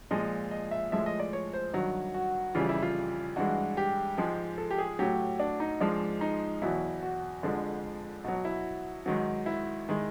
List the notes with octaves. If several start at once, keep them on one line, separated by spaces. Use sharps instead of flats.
A#2 F3 G#3 D#5
D#5
E5
A2 F3 G#3 E5
D#5
D5
C#5
C5
G2 D#3 F#3
F#4
F2 C#3 E3 G3 F4
E4
F4
G2 E3 G#3 F#4
G4
G#2 F3 G#3
A4
G4
G#4
A2 F#3 G4
D4
D#4
G#2 F3 G#3 D4
D#4
E2 B2 F#3 E4
F#4
F2 D3 F3 G#3
B2 F#3
E4
G#2 D#3 F#3
E4
D#3 G#3